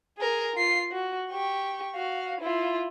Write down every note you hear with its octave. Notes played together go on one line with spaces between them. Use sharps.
G#4 A#4
F4 C7
F#4
G4 C#6
F#4 F5
E4 F4